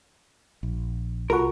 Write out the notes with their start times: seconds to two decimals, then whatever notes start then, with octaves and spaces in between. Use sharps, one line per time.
0.63 A#1
1.30 C2 F4 F#4 A4 A#4 F#5 C#6